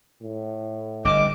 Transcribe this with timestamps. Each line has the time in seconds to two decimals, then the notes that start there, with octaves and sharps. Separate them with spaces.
0.22 A2
1.05 G1 G2 D#5 D6